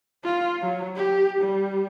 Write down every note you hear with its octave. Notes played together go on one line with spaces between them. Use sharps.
F4
F#3
G4
G3